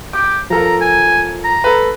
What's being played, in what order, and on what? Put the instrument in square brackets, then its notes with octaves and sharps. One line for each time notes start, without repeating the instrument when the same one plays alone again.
[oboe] G4 [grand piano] D6
[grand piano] F3 A4 A#4 [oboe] A#5
[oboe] G#5
A#5
[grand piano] A4 B4